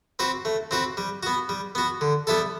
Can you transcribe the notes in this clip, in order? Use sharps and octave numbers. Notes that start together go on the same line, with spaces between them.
C4 F#4 B4
A3
C4 F#4 B4
G3
B3 F#4
G3
B3 F#4
D3
G3 B3 E4 A4